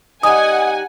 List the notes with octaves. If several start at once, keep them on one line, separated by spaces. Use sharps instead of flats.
G3 D#4 F#5 G#5 D#6